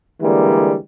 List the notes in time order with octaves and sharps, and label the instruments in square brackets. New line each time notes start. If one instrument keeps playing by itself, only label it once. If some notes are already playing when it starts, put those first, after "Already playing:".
[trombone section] D3 E3 G3 G#3 A#3